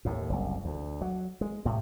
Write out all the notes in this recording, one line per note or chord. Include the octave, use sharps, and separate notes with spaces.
D#2 A2
F#1 C2
D2
F#3
G#3
A2 C3